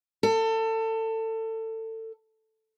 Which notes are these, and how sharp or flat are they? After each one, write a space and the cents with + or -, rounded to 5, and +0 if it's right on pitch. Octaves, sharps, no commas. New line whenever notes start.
A4 +25